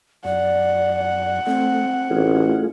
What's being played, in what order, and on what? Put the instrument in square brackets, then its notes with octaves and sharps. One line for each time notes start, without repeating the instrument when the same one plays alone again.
[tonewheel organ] F#2 [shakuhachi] D5 [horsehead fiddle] F#5
[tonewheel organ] A3 [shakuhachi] C4
[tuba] A1 [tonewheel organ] A3 F4 G#4